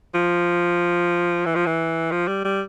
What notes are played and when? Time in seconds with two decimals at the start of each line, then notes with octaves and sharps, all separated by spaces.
0.14 F3
1.46 E3
1.55 F3
1.66 E3
2.11 F3
2.28 G3
2.44 G3